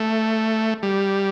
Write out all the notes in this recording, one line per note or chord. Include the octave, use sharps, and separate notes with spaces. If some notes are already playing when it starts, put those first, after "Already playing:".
Already playing: A3
G3